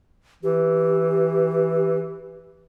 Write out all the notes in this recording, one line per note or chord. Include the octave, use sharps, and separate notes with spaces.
E3 G4